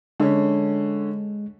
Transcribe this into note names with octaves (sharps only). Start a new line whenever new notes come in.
D3 G#3 C#4